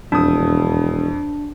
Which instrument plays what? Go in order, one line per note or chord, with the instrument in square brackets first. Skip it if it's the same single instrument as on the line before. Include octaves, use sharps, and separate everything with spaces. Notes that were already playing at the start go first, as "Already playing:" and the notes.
[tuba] E1 [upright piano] F2 D#6 [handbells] D4